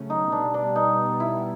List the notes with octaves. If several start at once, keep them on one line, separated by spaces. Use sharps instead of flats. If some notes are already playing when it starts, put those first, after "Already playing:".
Already playing: C#3 F#3 A3 C#4
D#4
B2 G3 B3 D4
D4
D#4
E4